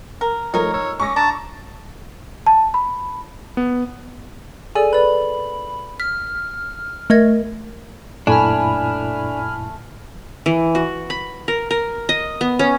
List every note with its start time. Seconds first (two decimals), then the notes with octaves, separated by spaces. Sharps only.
0.21 A#4
0.54 F3 A3 D#4 A#4 C#5
0.74 C#5 E6
1.00 C#4 C#6 D6 A#6
1.16 D4 A5 A#5
2.47 A5
2.74 B5
3.57 B3
4.75 G#4 A4 D5 G#5
4.93 B4 D5 B5
6.00 F6 B6
7.10 A3 A#4 D#5 G#6
8.27 F#2 A#2 A3 D4 E4 G#5 B5 F6
10.46 E3
10.75 F#4
11.10 B5
11.48 A#4
11.71 A#4
12.09 D#5
12.41 B3
12.59 C#4